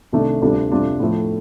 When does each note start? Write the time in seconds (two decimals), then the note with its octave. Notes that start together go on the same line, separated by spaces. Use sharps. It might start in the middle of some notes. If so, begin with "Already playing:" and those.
0.12 C2 C3 D#3 A3 D4
0.42 D2 C3 G3 D4 F4
0.71 F2 C3 G3 D4 F4
1.00 A2 F3 A3